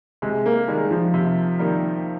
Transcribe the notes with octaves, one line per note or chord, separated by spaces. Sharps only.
C3 G#3
A#3
D#3 G3 G#3 A#3
F3
C3
D#3 G3 A#3